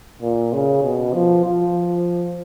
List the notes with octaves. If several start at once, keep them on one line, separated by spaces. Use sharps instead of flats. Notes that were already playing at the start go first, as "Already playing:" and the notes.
A#2
C#3
B2
F3
F3